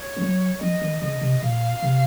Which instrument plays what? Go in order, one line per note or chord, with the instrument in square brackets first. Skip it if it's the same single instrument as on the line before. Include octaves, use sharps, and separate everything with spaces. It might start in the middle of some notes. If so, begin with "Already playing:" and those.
Already playing: [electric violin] C#5
[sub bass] F3
F#3
[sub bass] F3 [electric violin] D#5
[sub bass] D#3
[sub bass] C#3 [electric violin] D#5
[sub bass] C3
[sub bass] A#2 [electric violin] F5
[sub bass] C3